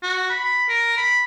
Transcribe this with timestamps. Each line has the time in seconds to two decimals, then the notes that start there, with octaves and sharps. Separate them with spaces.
0.03 F#4
0.30 B5
0.69 A#4
0.98 B5